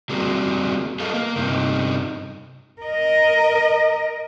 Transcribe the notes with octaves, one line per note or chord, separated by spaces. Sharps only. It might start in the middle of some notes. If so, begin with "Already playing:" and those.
F#3 G3 A#3 C4 F#4 G#4
G#4 A4 B4 D#5 F5
A#3
G2 C3 C4 D#4
A#4 D#5